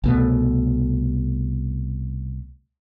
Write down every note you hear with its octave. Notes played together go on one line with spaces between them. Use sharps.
C2 B2 A3